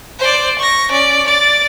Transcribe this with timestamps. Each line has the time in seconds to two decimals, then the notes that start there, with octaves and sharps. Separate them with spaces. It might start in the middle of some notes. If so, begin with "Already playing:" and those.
0.19 C5 D5
0.59 C#6 A#6
0.92 C#4 D5
1.27 D5 A6